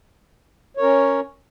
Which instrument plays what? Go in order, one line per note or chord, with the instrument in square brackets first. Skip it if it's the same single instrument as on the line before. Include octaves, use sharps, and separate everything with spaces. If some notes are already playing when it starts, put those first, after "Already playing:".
[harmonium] C#5
A#4
C#4